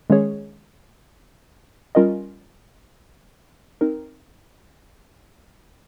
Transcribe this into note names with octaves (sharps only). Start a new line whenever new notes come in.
D#3 G#3 C#4 G#4 C#5
G3 C#4 F4 A#4 D#5
C4 D#4 A#4